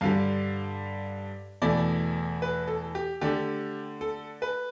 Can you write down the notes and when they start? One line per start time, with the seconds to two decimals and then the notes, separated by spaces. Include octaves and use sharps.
0.01 G2 D3 G3 F5
1.62 E2 B2 A3 E4 D5
2.42 B4
2.68 A4
2.95 G4
3.21 D3 A3 D4 G4
4.01 A4
4.42 B4